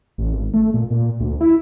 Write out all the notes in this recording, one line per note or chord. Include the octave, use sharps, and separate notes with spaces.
A1
G#1
A3
A#2
A#2
D2
E4